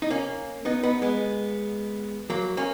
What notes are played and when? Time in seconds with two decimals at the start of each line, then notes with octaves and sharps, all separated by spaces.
0.02 D#4
0.10 A#3 C#4
0.65 B3 D#4
0.83 B3 D#4
1.02 G#3 B3
2.30 F#3 A#3
2.57 A#3 C#4